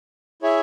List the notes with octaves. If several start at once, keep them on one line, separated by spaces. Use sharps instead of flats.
E4 G#4 C#5 E5 G#5